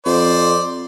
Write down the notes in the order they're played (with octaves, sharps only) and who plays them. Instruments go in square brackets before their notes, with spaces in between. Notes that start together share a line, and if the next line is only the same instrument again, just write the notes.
[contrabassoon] F2 [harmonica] C5 D5